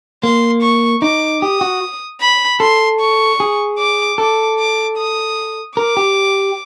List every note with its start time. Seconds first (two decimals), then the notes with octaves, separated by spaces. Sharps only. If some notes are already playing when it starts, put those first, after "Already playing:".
0.23 A#3 C6
0.62 C#6
1.02 D#4 D6
1.42 G4 D#6
1.61 F#4
2.21 B5
2.60 A4 C6
3.00 C#6
3.40 G#4
3.79 D6
4.18 A4 D6
4.59 D6
4.98 D#6
5.77 A#4 D6
5.97 G4